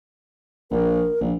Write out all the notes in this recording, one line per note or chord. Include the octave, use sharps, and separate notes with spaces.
A#1 A#4
A#1